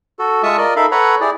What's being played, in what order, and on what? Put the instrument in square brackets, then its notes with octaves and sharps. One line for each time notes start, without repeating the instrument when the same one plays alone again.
[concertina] F#4 A4
G#3 F4 E5 A5 C#6 D#6
F4 A#4 D5 D#5
D#4 A4 A#4 E5 F5 B5
A4 B4 C#5 F#5 A#5 B5
E4 G4 G#4 D5